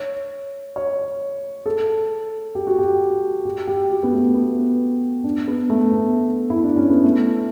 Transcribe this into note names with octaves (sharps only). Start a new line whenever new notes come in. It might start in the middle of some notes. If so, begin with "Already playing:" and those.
Already playing: C#5
C#5
A4
G4
F#4
G4
G4
G4
F#4
B3
A3
B3
D4
B3
A3
B3
E4
D4
C#4
B3
A3